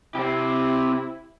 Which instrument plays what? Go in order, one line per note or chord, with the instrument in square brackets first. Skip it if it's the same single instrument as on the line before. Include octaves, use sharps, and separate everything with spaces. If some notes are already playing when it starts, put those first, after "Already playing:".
[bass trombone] C3 [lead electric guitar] C4 G4 [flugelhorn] E4